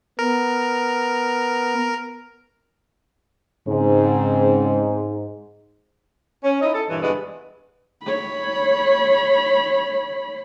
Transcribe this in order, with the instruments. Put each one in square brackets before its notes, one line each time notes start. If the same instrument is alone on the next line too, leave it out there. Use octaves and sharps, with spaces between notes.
[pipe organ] B3 [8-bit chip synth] A#4
[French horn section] G#2 [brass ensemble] C#3 C4
[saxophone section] C#4
D#4 E4 D#5
A4
G2 A#2 E3
G2 D3 G#3 B3
[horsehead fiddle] C#5 B5